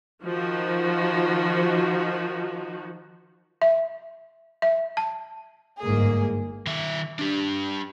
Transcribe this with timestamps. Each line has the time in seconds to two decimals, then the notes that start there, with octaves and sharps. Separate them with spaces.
0.24 D#3 F3 F#4
3.62 E5
4.62 E5
4.97 A5
5.81 G1 G#2 A#3 G#4
6.67 D#3 E5
7.19 D4 G4